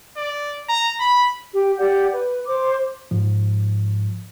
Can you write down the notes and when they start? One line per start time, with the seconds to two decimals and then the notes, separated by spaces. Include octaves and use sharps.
0.17 D5
0.69 A#5
1.01 B5
1.54 G4
1.77 G4 D5 F#5 G6
2.12 B4
2.47 C5 D6
3.11 G#2 F3